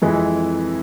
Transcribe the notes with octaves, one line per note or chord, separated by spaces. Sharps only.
F2 E3 G#3 E4